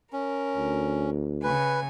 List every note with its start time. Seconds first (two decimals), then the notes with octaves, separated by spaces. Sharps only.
0.13 C#4 A#4
0.57 D2
1.43 C#3 B4 G#5